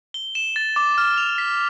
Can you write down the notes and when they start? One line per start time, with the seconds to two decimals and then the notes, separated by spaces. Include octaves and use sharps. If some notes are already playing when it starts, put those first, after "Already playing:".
0.14 G7
0.35 E7
0.56 A6
0.76 D6
0.98 F6
1.18 F7
1.38 B6